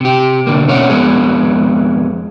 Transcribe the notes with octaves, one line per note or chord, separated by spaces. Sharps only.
C3 G4
B2 D3 A#3
B2 C#4 C#5 E5 F#5
F2 C#3 G#3 B3 G#4